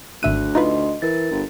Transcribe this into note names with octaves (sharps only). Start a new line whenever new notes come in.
G#1 D2 E5 F#6 D#7
D#4 F4 B4 D#5 C6
E3 A#4 A6
G1